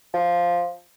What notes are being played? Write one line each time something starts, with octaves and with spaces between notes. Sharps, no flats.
F3